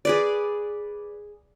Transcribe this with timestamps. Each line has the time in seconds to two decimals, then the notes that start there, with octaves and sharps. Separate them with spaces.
0.05 G#4 B4 D5